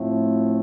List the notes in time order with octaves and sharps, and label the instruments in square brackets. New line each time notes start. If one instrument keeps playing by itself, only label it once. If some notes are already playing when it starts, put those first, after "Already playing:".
Already playing: [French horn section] A2 F3 A3 C4